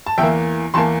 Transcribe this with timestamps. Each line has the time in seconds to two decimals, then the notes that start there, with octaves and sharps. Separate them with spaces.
0.06 A5
0.18 E2 E3 A#3 E5 G5
0.74 E2 E3 A#3 A5 C6